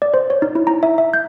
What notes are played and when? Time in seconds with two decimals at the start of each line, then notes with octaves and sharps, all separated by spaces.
0.02 D5
0.14 C5
0.30 C#5
0.42 D#4
0.55 E4
0.67 A#5
0.83 E5
0.98 E5
1.14 G6